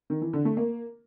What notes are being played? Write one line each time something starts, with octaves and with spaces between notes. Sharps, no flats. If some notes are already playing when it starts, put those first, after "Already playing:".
D#3
E3
D3
A3
A#3